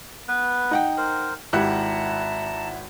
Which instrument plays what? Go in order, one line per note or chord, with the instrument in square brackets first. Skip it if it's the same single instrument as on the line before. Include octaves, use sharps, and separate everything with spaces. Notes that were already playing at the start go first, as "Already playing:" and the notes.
[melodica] B3 B4
[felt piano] D#4 F#5 G5
[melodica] A#4 C5
[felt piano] G#1 G4 F#6 [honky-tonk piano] E4 F#5 [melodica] A5 A#5